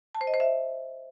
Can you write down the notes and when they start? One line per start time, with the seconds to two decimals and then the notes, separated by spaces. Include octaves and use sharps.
0.15 A5
0.21 C5
0.27 D#5
0.34 C5
0.40 E5